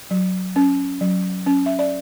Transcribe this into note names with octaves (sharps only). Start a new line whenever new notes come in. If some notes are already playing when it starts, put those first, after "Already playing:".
F#3
C#4
F#3
C#4
E5
D5